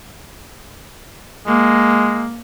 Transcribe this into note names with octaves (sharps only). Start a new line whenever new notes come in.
G#3 A#3